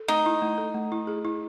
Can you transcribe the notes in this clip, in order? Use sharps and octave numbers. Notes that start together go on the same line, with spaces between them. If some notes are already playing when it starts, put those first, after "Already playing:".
Already playing: A4
A3 D#4
E4
A3
A4
A3
E4
G#4
E4